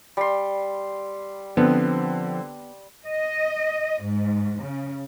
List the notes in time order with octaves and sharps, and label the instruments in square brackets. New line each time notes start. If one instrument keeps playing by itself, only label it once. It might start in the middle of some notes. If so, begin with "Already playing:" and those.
[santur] G3 C6
[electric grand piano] D3 C4 [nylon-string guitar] F3 [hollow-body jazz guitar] B3
[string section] D#5
G#2
C#3